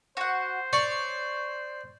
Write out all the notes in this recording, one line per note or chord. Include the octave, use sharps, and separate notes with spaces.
F#4 C5 F#5
C#5 D5 C#6